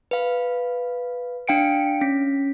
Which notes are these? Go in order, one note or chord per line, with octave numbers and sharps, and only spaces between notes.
B4 F5
D4 F5 G5 C#7 D7
C#4 B6